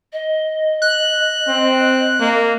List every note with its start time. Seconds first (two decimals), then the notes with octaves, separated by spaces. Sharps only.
0.13 D#5
0.82 F#6
1.48 C4
2.20 A#3